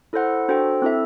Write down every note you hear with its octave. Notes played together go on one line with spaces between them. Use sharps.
E4 A4 C5 F#5
D4 F#4 A4 C5 G5
C4 E4 A4 E5